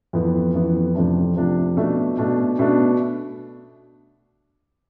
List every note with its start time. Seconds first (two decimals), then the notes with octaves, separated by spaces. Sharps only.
0.13 F2 E3 B3
0.53 F2 E3 B3
0.95 F2 C3 F3 A3 D4
1.36 F2 C3 F3 A3 D4
1.77 B2 A3 D4
2.18 B2 A3 D4
2.59 B2 A3 D4